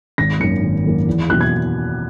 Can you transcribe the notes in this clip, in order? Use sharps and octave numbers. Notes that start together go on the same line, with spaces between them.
G#1 A#6
F#2 D#3 A#3 C#7
G#1
F#2 D#3 A#3
E2
B2 F#3 A#3 F#6
G#6